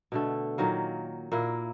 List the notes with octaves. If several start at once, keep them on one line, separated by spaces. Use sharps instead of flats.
B2 D3 A3
A#2 D#3 F#3 A#3
A#2 A#3 E4